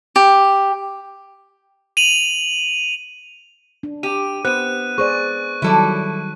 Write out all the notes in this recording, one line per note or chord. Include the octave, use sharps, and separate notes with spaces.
G4
D#7 F7 F#7
D4
G4 D#7
B3 C5 F#6 D#7
G#4 C5 D5 C#6
D#3 F#3 G3 E4 A4 D5